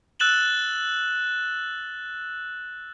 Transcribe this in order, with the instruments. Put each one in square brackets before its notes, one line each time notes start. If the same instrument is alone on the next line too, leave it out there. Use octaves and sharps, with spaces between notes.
[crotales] E6 F#6 A6 E7 F#7 G7